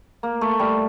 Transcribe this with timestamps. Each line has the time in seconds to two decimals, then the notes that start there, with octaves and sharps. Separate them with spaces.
0.23 A#3
0.41 A3
0.60 G3